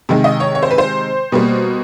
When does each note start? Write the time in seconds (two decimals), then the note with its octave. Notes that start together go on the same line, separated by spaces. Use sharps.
0.09 C3 D#3 G#3
0.24 D#5
0.40 C#5
0.55 C#5
0.63 C5
0.71 B4
0.78 C5
1.32 B2 G3 A#3